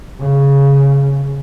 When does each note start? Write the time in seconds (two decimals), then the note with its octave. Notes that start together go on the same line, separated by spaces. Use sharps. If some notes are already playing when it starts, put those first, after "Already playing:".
0.19 C#3